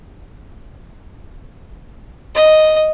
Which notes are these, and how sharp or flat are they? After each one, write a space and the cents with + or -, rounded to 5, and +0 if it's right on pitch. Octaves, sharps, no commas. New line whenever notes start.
D#5 +0